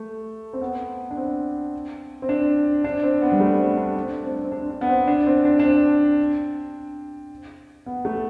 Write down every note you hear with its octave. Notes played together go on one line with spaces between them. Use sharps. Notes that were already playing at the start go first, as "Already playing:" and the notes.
Already playing: A3
C4
B3
D4
C4
C4
D4
D4
C4
B3
G3
A3
C4
D4
D4
C4
C4
D4
D4
B3
C4
D4
C4
D4
D4
C4
B3
A3